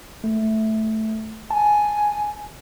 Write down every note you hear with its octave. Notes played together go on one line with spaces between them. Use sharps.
A3
G#5 A5